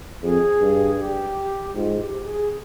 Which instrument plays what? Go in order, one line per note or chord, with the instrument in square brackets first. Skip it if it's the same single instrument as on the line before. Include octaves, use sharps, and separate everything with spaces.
[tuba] F2 [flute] G#4
[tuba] G2
[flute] G4
[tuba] G#2 [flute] F4
[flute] F4
G4
G#4